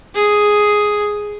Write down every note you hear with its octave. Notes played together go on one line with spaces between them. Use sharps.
G#4